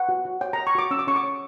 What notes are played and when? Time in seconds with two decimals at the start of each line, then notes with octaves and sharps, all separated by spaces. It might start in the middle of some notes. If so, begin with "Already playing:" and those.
Already playing: F#5
0.09 F#4
0.25 F#4
0.41 C#5 G5
0.53 A#5
0.58 C#5
0.67 C#6
0.75 F#4 D6
0.91 C#4 E6
0.99 D6
1.07 C#4 C#6
1.16 D6
1.23 C#5